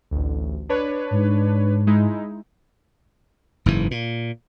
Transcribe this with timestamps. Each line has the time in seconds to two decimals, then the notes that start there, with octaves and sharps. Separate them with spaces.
0.11 A1 D2
0.69 D4 B4 C#5
1.11 G#2
1.87 G#3 D#4 E4
3.66 F#1 G#2 E3
3.91 A#2